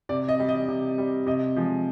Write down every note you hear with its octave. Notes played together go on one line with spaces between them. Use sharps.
C3 D5
D#5
G3
D#5
C3
G3
C3 D#5
F3 G#3